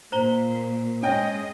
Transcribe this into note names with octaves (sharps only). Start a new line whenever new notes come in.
A#2 C5 A#5 G7
G#3 C#4 D#5 G5